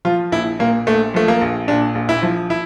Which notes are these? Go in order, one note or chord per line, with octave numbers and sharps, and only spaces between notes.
F3 F4
A#1 E4
A#2 A#3
A#1 A3
F3 A3
A#3
A#1
A#2 D4
A#1
E4
F3
E4